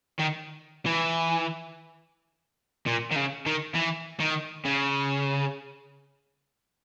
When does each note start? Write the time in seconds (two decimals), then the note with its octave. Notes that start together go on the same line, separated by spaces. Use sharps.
0.20 D#3
0.86 E3
2.86 A#2
3.11 D#3
3.16 C#3
3.46 D#3
3.75 E3
4.20 D#3
4.65 C#3